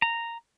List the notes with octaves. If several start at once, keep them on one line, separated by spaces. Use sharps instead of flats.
A#5